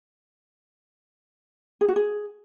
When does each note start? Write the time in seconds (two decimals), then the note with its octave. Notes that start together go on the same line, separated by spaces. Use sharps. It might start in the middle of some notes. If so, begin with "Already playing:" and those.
1.81 G#4
1.88 F#4
1.96 G#4